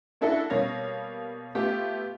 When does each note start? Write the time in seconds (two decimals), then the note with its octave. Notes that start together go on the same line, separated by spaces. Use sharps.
0.21 A#3 D4 E4 F#4 A4
0.50 B2 G3 A#3 C#5 F5 A#6
1.55 A3 B3 F4 G4